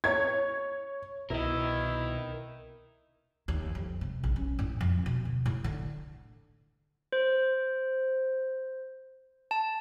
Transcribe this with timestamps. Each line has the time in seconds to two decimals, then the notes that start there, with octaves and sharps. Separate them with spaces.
0.04 C#5 G#6
1.30 C2 B2 E4 A#4 D#5
3.48 D#2
3.75 F2
4.01 C3
4.24 A#1
4.36 C#4
4.59 A2
4.81 F2
5.06 B2
5.25 D2
5.46 A2
5.64 D3
7.13 C5
9.51 A5